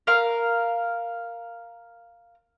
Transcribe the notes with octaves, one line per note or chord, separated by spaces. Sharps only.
A#4 F5